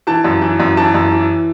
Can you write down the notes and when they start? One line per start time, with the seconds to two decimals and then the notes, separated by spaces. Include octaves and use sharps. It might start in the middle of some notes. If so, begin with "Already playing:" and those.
0.07 E3 A5
0.24 F#2
0.41 E3
0.60 F#2
0.77 E3 A5
0.94 F#2
1.12 E3